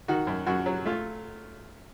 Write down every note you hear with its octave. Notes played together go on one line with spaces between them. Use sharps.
D#3 F#4
F#2
F#2 F#4
F#3
A3 F4